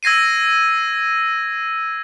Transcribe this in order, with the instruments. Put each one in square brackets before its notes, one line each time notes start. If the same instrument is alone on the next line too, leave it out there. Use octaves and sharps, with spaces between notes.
[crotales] E6 G#6 A#6 C7 D#7